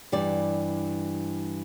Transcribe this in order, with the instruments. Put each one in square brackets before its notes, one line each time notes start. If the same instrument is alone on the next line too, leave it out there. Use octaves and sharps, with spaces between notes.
[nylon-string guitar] G2 E3 G3 D5